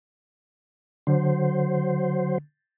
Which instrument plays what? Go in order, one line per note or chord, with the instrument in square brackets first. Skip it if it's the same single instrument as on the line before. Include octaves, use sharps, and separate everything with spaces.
[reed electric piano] D3 [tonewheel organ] F#3 C5